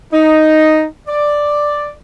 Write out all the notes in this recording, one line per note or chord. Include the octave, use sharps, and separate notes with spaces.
D#4
D5